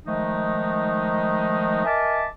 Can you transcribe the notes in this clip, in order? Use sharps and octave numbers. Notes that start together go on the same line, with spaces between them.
D#3 F3 G#3 A3 D#4
A#4 D#5 E5 G#5 A5 D6